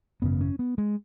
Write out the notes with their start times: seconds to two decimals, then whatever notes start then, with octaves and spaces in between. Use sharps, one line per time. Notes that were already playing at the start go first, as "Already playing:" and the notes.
0.22 G#1 F#2 C#3 B3
0.41 C#4
0.59 B3
0.78 G#3